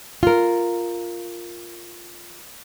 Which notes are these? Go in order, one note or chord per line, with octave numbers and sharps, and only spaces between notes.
F4 A#4